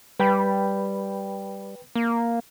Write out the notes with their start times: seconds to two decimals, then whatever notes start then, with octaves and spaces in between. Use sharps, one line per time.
0.20 G3 B4 G5 B5
1.95 A#3